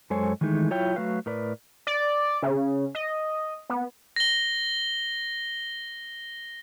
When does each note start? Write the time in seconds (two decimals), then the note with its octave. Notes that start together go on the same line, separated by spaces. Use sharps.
0.10 F#2 G#3 A4 C5 C#5 G#5
0.41 D#3 E3 G#3 A3 D#4
0.71 F#3 E4 F4 C#5 E5 G5
0.96 F#3 A3 F#4 B4 F5
1.26 A2 A#4 B4 D5
1.87 D5
2.43 C#3
2.95 D#5
3.70 B3
4.16 A#6 G7